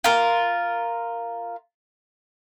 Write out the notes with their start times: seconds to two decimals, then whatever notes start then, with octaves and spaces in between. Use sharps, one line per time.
0.04 F4 A#4